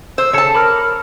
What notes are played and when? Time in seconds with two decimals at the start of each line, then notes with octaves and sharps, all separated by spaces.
0.18 C5 E6
0.33 C#3 A4 C#5 A5
0.55 A#4 B5 D6 F6